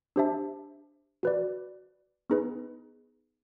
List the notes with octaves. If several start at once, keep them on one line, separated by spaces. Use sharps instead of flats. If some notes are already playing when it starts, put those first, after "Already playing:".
D4 G4 C5 E5 A5
F#4 B4 D5
B3 D#4 G#4 B4